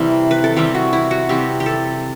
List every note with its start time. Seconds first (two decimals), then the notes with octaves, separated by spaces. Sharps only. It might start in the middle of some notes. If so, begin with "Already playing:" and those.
Already playing: C3 E3 G3 C4
0.31 B4
0.44 A4
0.56 C3 E3 G3 C4 G4
0.75 F#4
0.93 E4
1.11 F#4
1.29 C3 E3 G3 C4 G4
1.60 G4
1.66 A4